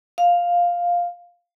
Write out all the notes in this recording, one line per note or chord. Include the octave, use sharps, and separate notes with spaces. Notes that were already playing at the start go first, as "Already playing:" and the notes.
F5